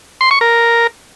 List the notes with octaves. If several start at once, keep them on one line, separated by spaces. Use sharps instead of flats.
C6
C#6
A#4